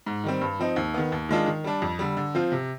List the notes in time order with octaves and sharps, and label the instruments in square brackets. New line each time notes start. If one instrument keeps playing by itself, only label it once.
[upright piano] G#2
D#3 G3 C4
G2
F3 C4 D#4
D#2
D#3 B3
D#2
D#3 G#3 D4 F4
D#3
G3 D4
F2
D3 G3
D3
F3 C4 F4
C3